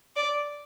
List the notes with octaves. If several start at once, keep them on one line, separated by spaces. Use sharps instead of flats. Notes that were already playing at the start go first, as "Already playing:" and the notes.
D5